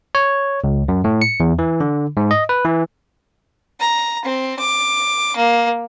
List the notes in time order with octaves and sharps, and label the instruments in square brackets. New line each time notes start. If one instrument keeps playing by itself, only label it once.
[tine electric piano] C#5
C#2
F#2
A2
C#7
E2
E3
D3
G#2
D#5
B4
E3
[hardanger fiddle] A#5
C4
D6
A#3